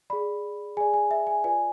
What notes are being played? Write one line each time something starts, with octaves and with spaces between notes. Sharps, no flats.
G#4 D5 B5
G#4 D5 G#5
G#5
E5
G#5
F4 B4 D5 G#5